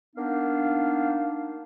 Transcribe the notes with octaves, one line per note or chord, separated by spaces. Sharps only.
A#3 B3 D4 D#4 F5